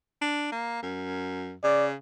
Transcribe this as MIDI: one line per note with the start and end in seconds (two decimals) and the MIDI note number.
0.21 0.51 62
0.52 0.80 58
0.82 1.55 42
1.64 1.94 49
1.64 1.87 74